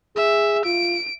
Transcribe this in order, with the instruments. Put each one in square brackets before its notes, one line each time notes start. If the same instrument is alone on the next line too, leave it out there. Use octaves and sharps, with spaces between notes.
[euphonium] G#4 [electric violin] E5
[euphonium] F4 [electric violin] D7